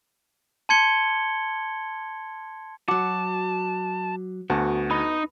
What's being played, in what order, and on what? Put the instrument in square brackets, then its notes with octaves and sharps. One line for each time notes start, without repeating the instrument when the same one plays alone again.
[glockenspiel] A5 C6 G#6 C#7 G7
[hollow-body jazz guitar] F#3 F#4 [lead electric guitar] A5 [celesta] D6
[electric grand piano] D2 F#4 A5 [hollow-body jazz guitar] B3
[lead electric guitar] D#4 [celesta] B5